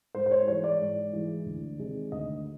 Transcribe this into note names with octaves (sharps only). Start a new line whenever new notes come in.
G#2 C5
C5
C#5
E3 G#3 C#5
D5
G#2
E3 G#3
D2
C3 D#3 G#3
D2 D#5